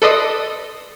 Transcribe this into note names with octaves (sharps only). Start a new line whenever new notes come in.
A4 B4 D5 D#5 C6 D#6